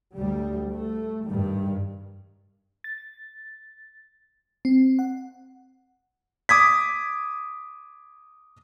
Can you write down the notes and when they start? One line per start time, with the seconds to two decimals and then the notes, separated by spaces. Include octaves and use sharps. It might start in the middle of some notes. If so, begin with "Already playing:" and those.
0.16 D2 G3
0.73 A3
1.27 G2 D#3 G3
2.84 A6
4.65 C4
4.99 F#5
6.49 D6 D#6 G#6 B6